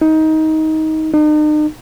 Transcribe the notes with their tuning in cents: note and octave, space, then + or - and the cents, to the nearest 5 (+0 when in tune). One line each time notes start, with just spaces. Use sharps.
D#4 +20
D#4 -40